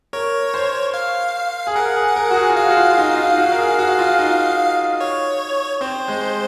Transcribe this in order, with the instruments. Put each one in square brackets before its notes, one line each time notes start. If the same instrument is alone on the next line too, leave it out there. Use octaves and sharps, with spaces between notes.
[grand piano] A#4 [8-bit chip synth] C#5
[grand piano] C5
[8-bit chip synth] F5
[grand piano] G#4
[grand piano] A#4 [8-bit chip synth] F#5
[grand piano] G#4
A#4
F#4
G#4
F4
[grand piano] F#4 [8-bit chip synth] F5
[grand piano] F#4
F4
F4
D#4
D#4
F4
F#4
A#4
G#4
F#4
F4
D#4
[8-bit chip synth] C#5
[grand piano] C4 [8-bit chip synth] C5
[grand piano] G#3